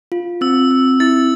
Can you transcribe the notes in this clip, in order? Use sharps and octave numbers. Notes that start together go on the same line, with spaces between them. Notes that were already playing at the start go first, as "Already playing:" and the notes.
F4
C4 E6
C4
E4 A6